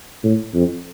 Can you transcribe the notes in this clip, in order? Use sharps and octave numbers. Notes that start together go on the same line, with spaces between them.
A2
F2